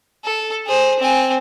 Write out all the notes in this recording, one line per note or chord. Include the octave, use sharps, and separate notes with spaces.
A4
G#4 C5
C4 G#5